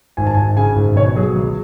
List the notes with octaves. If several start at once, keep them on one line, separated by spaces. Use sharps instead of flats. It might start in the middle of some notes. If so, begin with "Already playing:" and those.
G#1 G#5
A5
G#5
G#1
C#3 G#5
G#1
B2 C#5
F#3 G#4
C#2